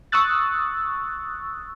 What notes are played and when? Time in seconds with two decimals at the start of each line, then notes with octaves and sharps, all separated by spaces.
0.12 C#6 D#6 E6 F#6 A6